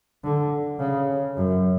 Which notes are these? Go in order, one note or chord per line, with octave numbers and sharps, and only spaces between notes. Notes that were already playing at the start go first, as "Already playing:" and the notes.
D3
C#3
F#2